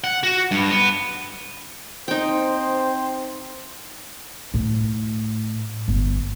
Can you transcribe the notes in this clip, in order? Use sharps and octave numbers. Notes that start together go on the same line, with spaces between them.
F#5
F#4
G2
B3
C4 D#4 C5 G5
A2
G1